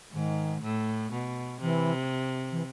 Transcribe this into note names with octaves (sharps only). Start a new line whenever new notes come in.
G#2 D#3
A2
B2
C3 E3
E3